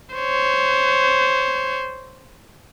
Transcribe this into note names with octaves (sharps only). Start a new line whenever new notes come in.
C5 C#5